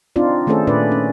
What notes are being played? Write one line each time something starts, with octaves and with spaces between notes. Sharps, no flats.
C4 D4 D#4 F4 D5
D#3 A3 C#4 G#4 A4 C5
A#2 D4 B4 D5
C#4